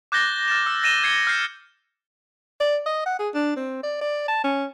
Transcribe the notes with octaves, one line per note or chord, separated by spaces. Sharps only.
D6 F#6 G6 A6 A#6 G7
F6 A6 E7
E6
A6 A#6 D#7 E7 G7
G#6 C7 C#7 G7
F6 G6 C7
D5
D#5
F#5
G#4
D4
C4
D5
D5
A5
C#4